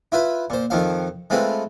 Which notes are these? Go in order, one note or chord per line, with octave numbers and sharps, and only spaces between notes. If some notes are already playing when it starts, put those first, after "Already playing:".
E4 F4 B4 B5
A#2 C5
F2 D#3 F3 F5
G#3 A3 C4 F4 B4